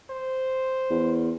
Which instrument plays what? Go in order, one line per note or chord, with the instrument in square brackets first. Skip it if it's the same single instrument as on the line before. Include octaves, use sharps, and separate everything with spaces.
[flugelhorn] C5
[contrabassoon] E2